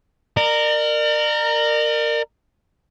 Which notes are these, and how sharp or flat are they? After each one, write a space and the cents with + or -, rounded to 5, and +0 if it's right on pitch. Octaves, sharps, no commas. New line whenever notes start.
A#4 -10 D5 +40